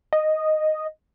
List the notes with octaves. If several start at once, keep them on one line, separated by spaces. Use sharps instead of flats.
D#5